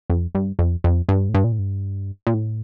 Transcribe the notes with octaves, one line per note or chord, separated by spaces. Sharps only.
F2
G2
F2
F2
G2
A2
G2
A#2
A2
G2
A#2
A2